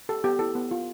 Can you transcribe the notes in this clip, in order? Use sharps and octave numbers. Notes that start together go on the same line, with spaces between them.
G4 A4
B3 G4
E4 A4
B3
F4